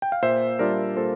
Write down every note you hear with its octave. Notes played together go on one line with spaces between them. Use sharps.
G5
F5
A#2 C5 E5
G3 D4 F4 A#4 D5
A#2 A4 C5